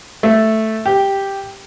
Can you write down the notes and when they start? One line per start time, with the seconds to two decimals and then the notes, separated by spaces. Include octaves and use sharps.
0.23 A3
0.86 G4